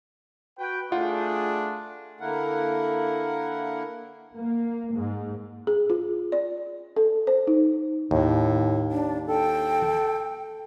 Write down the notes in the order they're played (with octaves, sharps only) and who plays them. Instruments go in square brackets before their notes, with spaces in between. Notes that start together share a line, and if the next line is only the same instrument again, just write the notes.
[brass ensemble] F#4 B4 G5
[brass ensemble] A3 D4 G#4 [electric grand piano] F4 F#5
[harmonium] D3 A#3 E4 A#4 F#5
[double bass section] A#3
G#2
[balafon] G#4
F4
D5
A4
C5
D#4
[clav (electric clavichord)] D#2 [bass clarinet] A2
[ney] D4
[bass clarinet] A4 [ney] G5